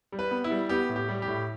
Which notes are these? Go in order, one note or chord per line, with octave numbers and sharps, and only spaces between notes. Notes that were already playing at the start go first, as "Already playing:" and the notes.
G3
B4
B3
E4
G3
B3 G4
A2
G4
G3
G4
A2